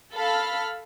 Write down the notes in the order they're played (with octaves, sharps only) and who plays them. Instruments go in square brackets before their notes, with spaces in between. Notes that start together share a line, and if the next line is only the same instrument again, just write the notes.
[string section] A4 F5 B5 F6